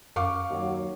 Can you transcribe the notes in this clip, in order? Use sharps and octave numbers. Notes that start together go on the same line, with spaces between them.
F#2 F5 C#6 D6
D#2 F#3